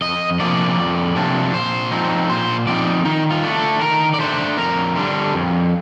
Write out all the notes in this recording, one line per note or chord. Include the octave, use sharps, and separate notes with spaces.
F2 D#5
C3 F3 A#3 D4 D5
F2
C3 F3 A#3 D4
A#2 C5
F3 C4 D#4
A#2 C5
F3 C4 D#4 D5
D#3 D#4
F4
A3 D4
A4
D#3 A#4
D5
A3 D4 C5
F2 A#4
D3 G3 D4
F2